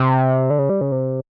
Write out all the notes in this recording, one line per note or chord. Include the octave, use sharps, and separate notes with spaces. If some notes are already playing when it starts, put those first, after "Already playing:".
Already playing: C3
D3
C#3
G3
C#3
C3